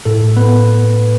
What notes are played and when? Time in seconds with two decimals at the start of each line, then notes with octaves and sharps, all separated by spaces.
0.05 A2 A4
0.37 B3 B4